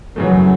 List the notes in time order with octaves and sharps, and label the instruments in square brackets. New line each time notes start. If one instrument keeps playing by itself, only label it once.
[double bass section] F#2 F#3 [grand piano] C#3 E3 A3